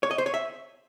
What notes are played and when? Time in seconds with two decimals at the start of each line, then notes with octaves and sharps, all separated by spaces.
0.03 C#5
0.11 D#5
0.18 C5
0.26 C#5
0.34 E5